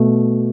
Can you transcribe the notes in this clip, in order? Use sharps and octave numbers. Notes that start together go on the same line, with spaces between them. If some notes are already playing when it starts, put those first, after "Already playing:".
Already playing: B2 A3